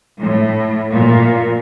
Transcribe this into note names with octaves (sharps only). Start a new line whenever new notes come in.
A2
A#2